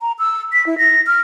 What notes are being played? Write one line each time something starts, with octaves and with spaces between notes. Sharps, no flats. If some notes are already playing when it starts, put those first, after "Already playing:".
A#5
E6
B6
E4
A#6
F6